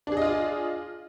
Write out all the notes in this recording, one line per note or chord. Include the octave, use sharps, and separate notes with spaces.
D4 F4 G#4 D#5